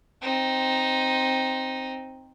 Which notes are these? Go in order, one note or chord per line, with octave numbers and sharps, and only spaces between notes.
C4 D#4